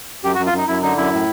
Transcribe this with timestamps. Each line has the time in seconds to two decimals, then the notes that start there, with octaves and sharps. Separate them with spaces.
0.24 F#2 G4
0.34 F#4
0.39 F#2
0.46 F4
0.53 F#2 D#4
0.68 F#2 E4
0.82 D3 D#4
0.97 F#2 E4
1.13 A2